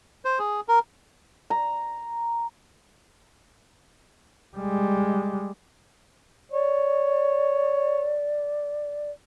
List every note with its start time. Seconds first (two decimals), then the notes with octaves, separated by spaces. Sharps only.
0.25 C5
0.39 G#4
0.68 A#4
1.50 A#5
4.57 G3 G#3
6.52 C#5 D5